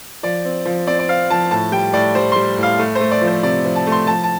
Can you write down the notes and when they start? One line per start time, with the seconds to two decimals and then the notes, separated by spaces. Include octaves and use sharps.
0.23 F3 D5
0.45 C4
0.65 F3
0.87 C4 D5
0.99 D5
1.09 C4 F5
1.30 F3 A5
1.51 A2 A5
1.72 G3 G5
1.94 A2 D5
2.15 G3 C5
2.32 G3 C6
2.58 A2 F5
2.79 A3
2.95 C5
3.01 A3
3.11 D5
3.21 F3
3.27 C5
3.43 C3 D5
3.65 F3
3.75 A5
3.87 A3
3.92 C6
4.07 F3 A5
4.24 A5